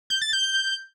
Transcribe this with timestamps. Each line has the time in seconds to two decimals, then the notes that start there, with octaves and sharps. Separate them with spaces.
0.10 G6
0.21 A6
0.33 G6